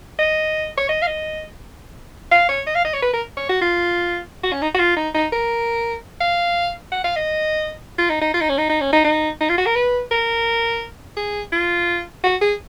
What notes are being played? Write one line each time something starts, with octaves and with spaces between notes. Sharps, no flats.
D#5
C#5
D#5
F5
D#5
F5
C#5
D#5
F5
D#5
C#5
B4
A#4
C#5
F#4
F4
F#4
C#4
D#4
F#4
F4
D#4
D#4
A#4
F5
F#5
F5
D#5
F4
D#4
D#4
F4
D#4
C#4
D#4
D#4
C#4
D#4
D#4
D#4
F4
F#4
A#4
B4
A#4
G#4
F4
F#4
G#4